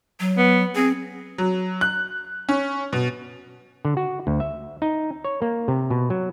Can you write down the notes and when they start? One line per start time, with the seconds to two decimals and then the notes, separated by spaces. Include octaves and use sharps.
0.20 F#3
0.38 B3
0.75 C4 G#4
1.38 F#3
1.81 F#6
2.49 C#4
2.93 B2
3.85 D3
3.97 F#4
4.27 D2
4.40 E5
4.82 D#4
5.25 C#5
5.42 A#3
5.68 C3
5.91 B2
6.10 F#3